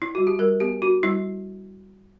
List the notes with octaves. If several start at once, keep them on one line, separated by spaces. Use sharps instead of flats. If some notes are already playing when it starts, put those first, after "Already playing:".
E4
G3 F#4
G4
G3 A#4
B3 G4
D4 F#4
G3 E4